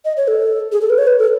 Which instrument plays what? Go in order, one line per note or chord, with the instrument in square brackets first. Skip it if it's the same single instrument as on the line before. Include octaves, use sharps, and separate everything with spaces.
[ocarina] D#5
C#5
A4
G#4
A4
B4
C#5
B4
A4